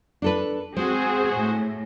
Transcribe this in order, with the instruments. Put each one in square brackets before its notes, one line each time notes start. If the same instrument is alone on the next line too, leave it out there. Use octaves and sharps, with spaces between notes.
[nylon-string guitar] D4 A4 B4
[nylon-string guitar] G#3 [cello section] C4 G#4 [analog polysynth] F#4 C5
[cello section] A2